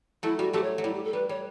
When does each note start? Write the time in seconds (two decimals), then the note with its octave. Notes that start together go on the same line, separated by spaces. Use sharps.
0.23 F#3 A3 E4
0.38 G3 F#4
0.53 F#3 A3 G4
0.64 C#5
0.78 F#3
0.84 G3 E4
0.94 G4
1.04 A4
1.13 G3 B4
1.29 G3 C#5